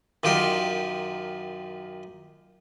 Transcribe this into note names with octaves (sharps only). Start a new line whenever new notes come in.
F#2 D#3 F4 G4 A#4 C6